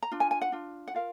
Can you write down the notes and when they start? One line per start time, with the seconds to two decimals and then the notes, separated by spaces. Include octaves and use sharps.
0.03 A#5
0.12 D4 F4
0.20 G#5
0.31 G#5
0.41 F#5
0.52 D4 F4
0.88 F#5
0.94 F4 A#4 F5